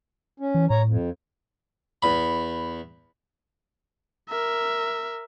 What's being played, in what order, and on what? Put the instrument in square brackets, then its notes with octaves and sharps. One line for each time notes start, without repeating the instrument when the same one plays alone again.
[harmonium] C#4
[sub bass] E3
[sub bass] A2 [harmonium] C#5 A#5
[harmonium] F2
[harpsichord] E2 B5
[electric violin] A#4 E5